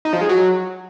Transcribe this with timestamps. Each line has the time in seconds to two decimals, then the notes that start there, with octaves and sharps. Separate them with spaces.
0.05 D#4
0.13 F3
0.21 G#3
0.29 F#3